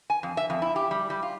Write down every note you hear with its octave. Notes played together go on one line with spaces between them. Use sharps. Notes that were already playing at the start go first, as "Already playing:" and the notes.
G#5
F2
E5
F2
E4
G4
G3
G3
F4